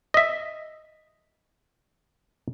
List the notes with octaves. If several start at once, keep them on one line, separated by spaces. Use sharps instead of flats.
D#5 E5